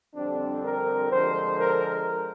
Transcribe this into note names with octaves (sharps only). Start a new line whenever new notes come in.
F2 D3 G3 C4 D4
A#4
D3 F3 G#3 C5
A#4